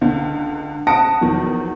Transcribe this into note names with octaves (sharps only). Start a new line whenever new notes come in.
C#2 D3
F#5 A5 D#6 A#6 C#7 D7
E2 D#3 F3 F#3